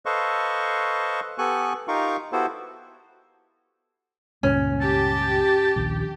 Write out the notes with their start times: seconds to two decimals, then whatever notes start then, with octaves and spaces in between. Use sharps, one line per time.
0.06 A4 B4 C5 D#5 F5 C#6
1.38 B3 G4 A4 G#5 C#6 F#6
1.88 D#4 F4 G4 A#4 F5 C#6
2.32 B3 E4 F#4 G4 A4 C5
4.43 C#2 G2 A#2 C#4
4.81 G4 A5
5.76 A#1 D#2